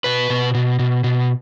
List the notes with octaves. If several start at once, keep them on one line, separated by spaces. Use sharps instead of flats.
B2 B4
B2
B2
B2
B2